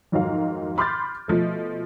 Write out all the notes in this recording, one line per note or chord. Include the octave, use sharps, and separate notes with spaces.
F2 G#2 D#3 F#3 A#4 F5
B5 C6 D6 F6 G6 A6
B2 F3 A3